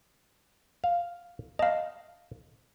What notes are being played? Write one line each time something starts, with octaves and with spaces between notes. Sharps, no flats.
F5
D#5 F5 A5